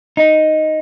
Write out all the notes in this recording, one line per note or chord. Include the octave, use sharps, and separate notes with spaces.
D#4